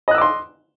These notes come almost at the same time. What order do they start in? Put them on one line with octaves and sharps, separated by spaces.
D#5 F#6 E6 D6 C6